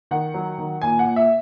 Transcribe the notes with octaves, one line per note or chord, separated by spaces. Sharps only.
D#3 F#5
F#3
D#3
A#2 G#5
F#5
A#2
E5